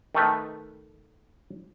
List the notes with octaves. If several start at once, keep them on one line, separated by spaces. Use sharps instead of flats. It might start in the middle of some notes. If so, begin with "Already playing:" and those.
D#3 A3 B4